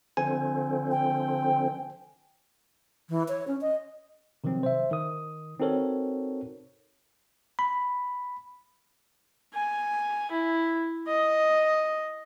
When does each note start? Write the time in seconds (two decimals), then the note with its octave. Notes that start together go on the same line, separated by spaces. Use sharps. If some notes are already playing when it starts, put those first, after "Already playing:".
0.17 D3 F3 C4 G#5
0.91 G5
3.09 E3
3.28 C#5
3.48 C#4
3.61 D#5
4.44 C3 D#3 F3 F#3 C4
4.63 C5 E5
4.91 D#3 D#6
5.60 C4 D#4 F#4 A4 A#4 C#5
7.59 B5
9.54 G#5
10.31 E4
11.08 D#5